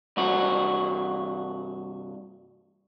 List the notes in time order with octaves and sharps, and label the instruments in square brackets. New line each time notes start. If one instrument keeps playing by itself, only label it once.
[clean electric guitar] C2 G2 F#4